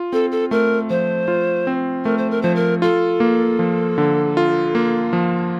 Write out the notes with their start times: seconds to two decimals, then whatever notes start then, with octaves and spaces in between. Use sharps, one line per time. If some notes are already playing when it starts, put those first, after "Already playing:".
Already playing: F4
0.13 C4 A4
0.32 A4
0.51 A3 A#4
0.90 F3 C5
1.28 F4
1.67 C4
2.05 A3 A#4
2.18 C5
2.30 A#4
2.42 F3 C5
2.55 A#4
2.82 F4 A4
3.20 A#3
3.59 F3
3.98 D3
4.37 F4
4.75 A#3
5.13 F3